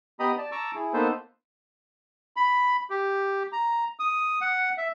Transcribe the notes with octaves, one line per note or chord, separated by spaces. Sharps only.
B3 G4 D#5 A#5 B5 D#6
D5 A5
A5 A#5 C#6 D6 E6
E4 G#4
A#3 B3 D#4 A4 B4 C5
B5
G4
A#5
D#6
F#5
E5